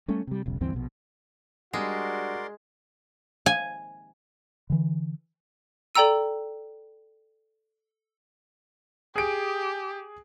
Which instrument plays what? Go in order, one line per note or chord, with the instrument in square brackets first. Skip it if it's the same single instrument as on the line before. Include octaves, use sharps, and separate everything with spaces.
[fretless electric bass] G3 A3 C#4
C3 G3
E1 B1 C#3
D2 G2 E3 C4
A#1 B2
[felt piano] G3 D4 [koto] G#3 [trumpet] F#4 [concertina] A#4 D5 C6
[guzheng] G#5
[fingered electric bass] D3 E3
[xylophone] A4 D5 G5 A#5 E6 D#7
[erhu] G4 [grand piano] G#4 D7